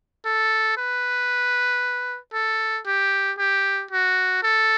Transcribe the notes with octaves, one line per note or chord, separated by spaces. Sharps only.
A4
B4
A4
G4
G4
F#4
A4